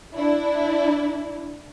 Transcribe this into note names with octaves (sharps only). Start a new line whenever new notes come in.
D4 E4